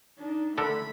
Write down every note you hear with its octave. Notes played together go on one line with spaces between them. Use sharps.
D4 D#4
D3 A3 A4 A#4 B5